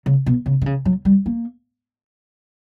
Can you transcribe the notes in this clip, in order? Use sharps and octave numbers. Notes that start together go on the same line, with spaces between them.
C#3
B2
C#3
D3
C#3
F#3
G3
A#3